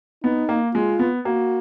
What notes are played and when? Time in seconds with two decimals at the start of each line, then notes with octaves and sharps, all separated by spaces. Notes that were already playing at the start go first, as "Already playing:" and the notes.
0.23 B3 D#4
0.49 A#3
0.74 G#3 F4
0.99 B3
1.25 A#3 F#4